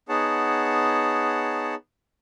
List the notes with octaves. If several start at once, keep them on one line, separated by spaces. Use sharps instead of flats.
B3 D#4 G#4 C#5 F#5 A5